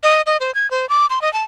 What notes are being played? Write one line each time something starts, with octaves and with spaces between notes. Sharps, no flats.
D#5
D#5
C5
G#6
C5
D6
C6
D#5
A5